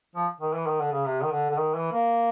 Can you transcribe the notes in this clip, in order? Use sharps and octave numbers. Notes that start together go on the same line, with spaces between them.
F3
D#3
E3
D#3
D3
C#3
C3
D#3
D3
D3
D#3
E3
A#3